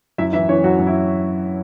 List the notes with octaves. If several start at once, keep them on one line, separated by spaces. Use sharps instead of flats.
F#2 E4 E5
E3 E4 E5
E3 C#4 C#5
F#2 F#4
F#2
E4